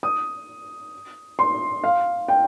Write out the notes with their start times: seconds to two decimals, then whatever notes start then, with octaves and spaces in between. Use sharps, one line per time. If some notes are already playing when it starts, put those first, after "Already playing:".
0.03 D#6
1.39 C6
1.84 F5
2.28 G5